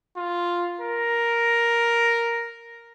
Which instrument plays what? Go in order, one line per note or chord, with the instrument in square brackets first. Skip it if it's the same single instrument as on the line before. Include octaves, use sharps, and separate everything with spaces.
[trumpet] F4
A#4